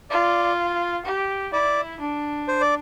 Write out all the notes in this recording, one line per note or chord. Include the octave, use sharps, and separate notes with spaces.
F4 D5
G4
E4 D5
D4
C5
D5